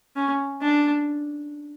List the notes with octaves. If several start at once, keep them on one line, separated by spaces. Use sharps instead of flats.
C#4
D4